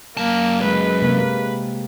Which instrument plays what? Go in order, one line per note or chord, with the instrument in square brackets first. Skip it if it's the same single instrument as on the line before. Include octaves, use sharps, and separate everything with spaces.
[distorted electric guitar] F#2 A5 [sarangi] A#3
[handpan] G#3 [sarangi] B4
[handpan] C3 A#3